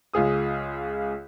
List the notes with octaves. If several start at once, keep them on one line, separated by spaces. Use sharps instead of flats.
C#2 F4 G#4 D#6